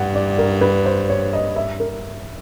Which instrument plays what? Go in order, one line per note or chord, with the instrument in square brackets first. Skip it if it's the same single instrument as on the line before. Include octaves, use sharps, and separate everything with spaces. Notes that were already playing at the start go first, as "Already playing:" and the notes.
Already playing: [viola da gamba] G2 [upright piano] F#5
[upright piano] D5
A#4
B4
C5
C#5
D#5
E5
A#4